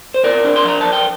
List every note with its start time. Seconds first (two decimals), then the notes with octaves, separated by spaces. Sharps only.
0.14 C5
0.24 C3 A#4 D5
0.45 D4
0.56 C6
0.65 F3 A#5
0.81 F3 A5
0.93 G5